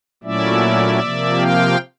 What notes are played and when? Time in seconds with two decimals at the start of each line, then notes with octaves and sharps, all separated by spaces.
0.23 A#2 F#3 A3 C#4 E4 D5 E5
1.00 C3 F3 A#3
1.38 F5 G5